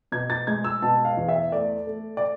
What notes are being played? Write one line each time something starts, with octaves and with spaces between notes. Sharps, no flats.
B2 G#6
A6
G#3 G#6
E6
B2 A5
F5
E2
E5
A3 D5
A3
D5